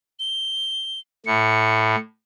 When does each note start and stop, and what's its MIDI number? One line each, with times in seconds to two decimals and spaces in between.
0.19 1.00 103
1.26 1.95 45
1.26 1.99 97